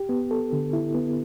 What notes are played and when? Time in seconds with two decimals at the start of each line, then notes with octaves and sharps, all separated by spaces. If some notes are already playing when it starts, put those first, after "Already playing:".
Already playing: G4
0.09 B3
0.31 A4
0.53 D3
0.73 E4
0.95 B3